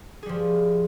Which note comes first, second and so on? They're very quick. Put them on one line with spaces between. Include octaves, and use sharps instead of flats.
G#4 G3 F3